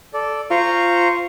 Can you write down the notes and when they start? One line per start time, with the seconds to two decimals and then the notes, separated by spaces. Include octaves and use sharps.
0.14 A4 D5
0.51 F4 C5 A#5 C#6